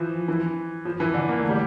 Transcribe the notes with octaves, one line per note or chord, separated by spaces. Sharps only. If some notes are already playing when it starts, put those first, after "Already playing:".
Already playing: E3 F3
E3
F3
E3
D3
A#3
A3
G3